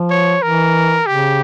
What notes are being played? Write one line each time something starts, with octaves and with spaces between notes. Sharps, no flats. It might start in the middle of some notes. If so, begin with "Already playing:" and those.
Already playing: F3
C#5
E3 A#4
C#3 G4